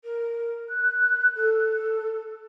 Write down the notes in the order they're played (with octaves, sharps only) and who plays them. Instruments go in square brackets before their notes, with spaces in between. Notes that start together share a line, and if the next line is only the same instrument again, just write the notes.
[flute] A#4
F#6
A4